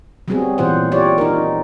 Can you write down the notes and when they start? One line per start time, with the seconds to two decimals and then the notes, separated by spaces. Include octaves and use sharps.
0.28 F#3 G3 B3 C4 F#4 G#4
0.58 A#2 E3 F4 C5 F#5
0.92 F4 G4 C#5 D5
1.18 D#4 A#4